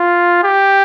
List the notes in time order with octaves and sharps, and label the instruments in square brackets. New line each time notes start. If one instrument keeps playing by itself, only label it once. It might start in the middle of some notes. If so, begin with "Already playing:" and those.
Already playing: [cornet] F4
G4